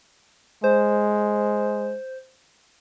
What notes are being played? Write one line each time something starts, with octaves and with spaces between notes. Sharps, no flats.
G#3 C5